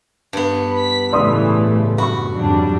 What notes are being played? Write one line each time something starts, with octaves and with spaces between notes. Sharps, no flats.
G2 B3
B5 B6
A2 C#3 E3 A3 D5 C6 D#6
F#2 F#4 B5 C#6
F2 G#2 D3 F#3 G3 D4